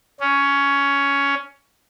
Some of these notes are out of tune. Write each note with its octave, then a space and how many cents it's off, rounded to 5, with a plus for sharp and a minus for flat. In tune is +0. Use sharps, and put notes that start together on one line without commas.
C#4 +10